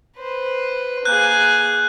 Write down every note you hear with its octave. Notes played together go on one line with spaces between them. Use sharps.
B4 C5
A#3 G#4 F#6 G6